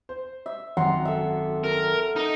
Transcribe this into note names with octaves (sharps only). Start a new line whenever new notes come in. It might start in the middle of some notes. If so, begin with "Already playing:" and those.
C5
E5
G#1 F#2 F#5 A#5 C6
A4 E5
A#4
D#4